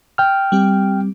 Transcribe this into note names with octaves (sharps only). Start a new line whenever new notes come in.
G5 F6
G3 C4 G4